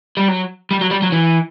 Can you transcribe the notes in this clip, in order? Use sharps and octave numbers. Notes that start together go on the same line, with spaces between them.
G3
F#3
G3
F#3
G3
F#3
E3